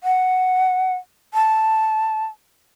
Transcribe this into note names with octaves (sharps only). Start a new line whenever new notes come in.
F#5
A5